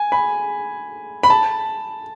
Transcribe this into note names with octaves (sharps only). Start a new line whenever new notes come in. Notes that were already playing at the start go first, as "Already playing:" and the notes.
Already playing: G#5
B5
B5
A5